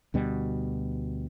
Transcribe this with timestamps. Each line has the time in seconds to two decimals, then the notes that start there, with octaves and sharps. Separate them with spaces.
0.14 D2 B2 G3